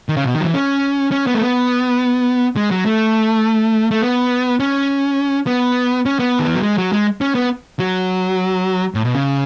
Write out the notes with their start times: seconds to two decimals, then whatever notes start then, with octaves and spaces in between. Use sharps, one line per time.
0.09 D#3
0.17 C#3
0.25 B2
0.34 D#3
0.40 F#3
0.45 E3
0.54 C#4
1.11 C#4
1.27 B3
1.35 A3
1.41 B3
2.56 G#3
2.71 F#3
2.85 A3
3.91 A3
4.02 B3
4.60 C#4
5.47 B3
6.06 C#4
6.19 B3
6.39 D#3
6.47 E3
6.55 F#3
6.62 G#3
6.78 F#3
6.92 G#3
7.21 C#4
7.35 B3
7.79 F#3
8.95 A2
9.04 B2
9.15 C#3